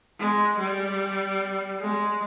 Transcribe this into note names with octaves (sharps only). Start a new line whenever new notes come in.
G#3
G3
G#3